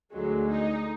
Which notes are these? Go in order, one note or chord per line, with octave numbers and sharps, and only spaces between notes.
D2 D3 F#3 G#3
D#4